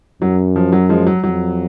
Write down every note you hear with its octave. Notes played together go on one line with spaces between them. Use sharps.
F#2 F#3
F3
F#3
F3 G#3
F#3
F2 F#3